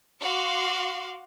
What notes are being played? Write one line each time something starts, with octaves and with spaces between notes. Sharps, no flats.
F#4 F5 C6 D6